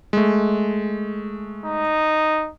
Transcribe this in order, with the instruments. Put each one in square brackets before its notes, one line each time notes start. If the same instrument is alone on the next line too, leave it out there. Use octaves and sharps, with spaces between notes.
[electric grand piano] G#3 A3
[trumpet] D#4